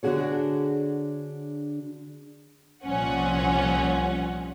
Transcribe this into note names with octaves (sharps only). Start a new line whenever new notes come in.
D3 D4 F#4 G#4 C#5
C2 A#2 F3 C#4 F#5